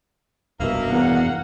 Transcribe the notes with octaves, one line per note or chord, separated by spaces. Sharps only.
F1 G2 B2 A#3 A#4 E5
E2 F#5